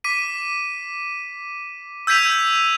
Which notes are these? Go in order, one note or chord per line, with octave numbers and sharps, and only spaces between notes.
D6 B6 D#7
E6 G6 G#6 B6 D#7 F7